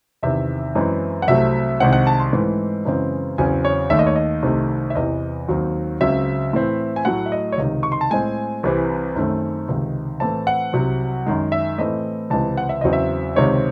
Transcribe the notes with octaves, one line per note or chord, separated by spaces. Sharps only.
E2 C3 D#3 E5
F#2 E3 G#3 C4
F#5
C2 C3 F#3 A3 C4 E5
C2 C3 D#3 G#3 C4 F#5
F#5
A5
C6
G#2 E3 A3 C4
F#2 C#3 E3 G#3 C4
E2 C#3 F#3 C4 G#5
C#5
D#2 D#3 A3 E5
D#5
C#5
D#5
C2 C3 D#3 A3 C4
E5
E2 C3 E3 D#5
D#2 D#3 F#3 C4
C#2 C#3 F#3 C4 E5
A2 E3 C4
G#5
A2 F#3 A3 F#5
E5
D#5
C#5
C#2 C3 D#3 D#5
C#6
C6
A5
A2 G#3 C4 G#5
C2 C3 E3 C4
F#2 D#3 A3 C4
C#2 C3 D#3
A2 E3 A3 C4 A5
F#5
C2 C3 F#3
F#2 D#3 G#3
E5
A2 E3 A3 C4 D#5
C#2 C3 E3 G#3 C4 A5
F#5
E5
E2 C#3 F#3 C4 D#5
E5
C#2 C3 D#3 G#3 C4 C#5